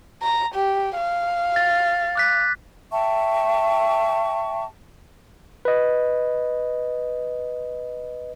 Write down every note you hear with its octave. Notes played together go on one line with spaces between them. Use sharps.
A#5
G4
F5
A6
D6 F#6 B6
E5 G5 A5 C#6
B4 D#5